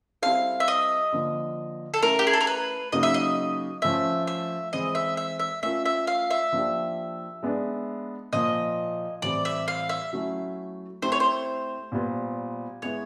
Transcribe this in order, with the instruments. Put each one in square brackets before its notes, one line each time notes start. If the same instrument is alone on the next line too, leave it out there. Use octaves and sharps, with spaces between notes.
[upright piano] G3 C4 E4 A4 [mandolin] F5
[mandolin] E5
D#5
[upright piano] D3 F3 A#3
[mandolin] A4
[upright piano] A3 C#4 E4 [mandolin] A#4
[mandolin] G4
G#4
A4
A#4
B4
[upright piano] C#3 F#3 A#3 D#4 [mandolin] D#5
[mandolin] E5
D#5
[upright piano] F3 A3 C#4 [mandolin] E5
[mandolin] E5
[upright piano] E3 G#3 C4 [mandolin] D#5
[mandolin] E5
E5
E5
[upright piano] A3 C#4 F4 A#4 [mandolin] E5
[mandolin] E5
F5
E5
[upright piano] F3 A#3 D4 G4
G#3 B3 D4
[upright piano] A#2 F3 A#3 [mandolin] D#5
[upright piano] A2 E3 G3 C4 [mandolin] D5
[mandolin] E5
F5
E5
[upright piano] F#3 A3 C#4 E4
[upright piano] A3 C4 E4 G4 [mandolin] C5
[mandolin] C#5
C5
[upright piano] A#2 G3 B3
[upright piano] G#3 B3 E4 [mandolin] C#5